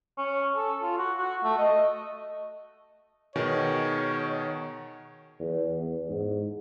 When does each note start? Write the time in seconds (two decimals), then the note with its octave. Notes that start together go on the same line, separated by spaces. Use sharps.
0.18 C#4
0.56 A4
0.82 F4
0.98 F#4
1.18 F#4
1.44 A3
1.58 D#5
3.36 B2 D#3 G#4 C#5
5.40 E2
5.79 E2
6.09 G#2